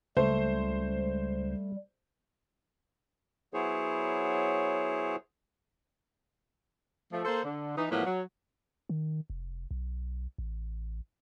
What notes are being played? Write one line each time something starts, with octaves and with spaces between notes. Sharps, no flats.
C#2 G3 A3 C5
F#3 B3 E4 G#4 C5 C#5
F3 A3
A#3 A4 C5
D3
E3 D#4
A2 F3 F#3 A#3 B3
F#3
D#3
F1
B1
A1